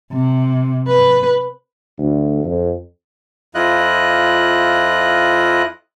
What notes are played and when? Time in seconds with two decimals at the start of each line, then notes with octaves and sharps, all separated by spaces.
0.12 C3
0.88 B4
1.98 D2
2.44 F2
3.55 F2 E4 F4 D#5 F#6